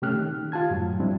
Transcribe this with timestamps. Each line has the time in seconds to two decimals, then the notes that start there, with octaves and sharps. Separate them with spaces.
0.02 C3 A3 C#4 G4 F6 F#6
0.14 D#3
0.52 F4 G4 A5 G#6
0.70 F#2 A2 F#3
1.00 F3 G3 C4 D4 E4